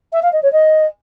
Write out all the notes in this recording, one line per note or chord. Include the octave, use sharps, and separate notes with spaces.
E5
F5
D#5
C#5
D#5